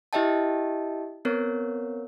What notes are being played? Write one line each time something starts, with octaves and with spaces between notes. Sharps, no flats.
E4 G4 D#5 E5 G5 A5
B3 C4 A#4 C#5